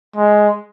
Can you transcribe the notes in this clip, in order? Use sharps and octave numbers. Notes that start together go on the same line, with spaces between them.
G#3